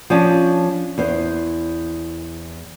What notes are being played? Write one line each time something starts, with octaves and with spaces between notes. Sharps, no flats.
F3 C#4 D4 A5
E2 C5